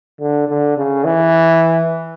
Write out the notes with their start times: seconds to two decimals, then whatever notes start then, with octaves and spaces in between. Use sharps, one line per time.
0.20 D3
0.48 D3
0.77 C#3
1.04 E3